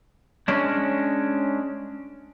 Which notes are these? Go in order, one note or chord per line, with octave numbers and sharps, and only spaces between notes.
G#3 C#4 D4